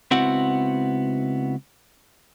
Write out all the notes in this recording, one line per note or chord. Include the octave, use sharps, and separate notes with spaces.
C#2 B3 C4 E4 F#4 F#5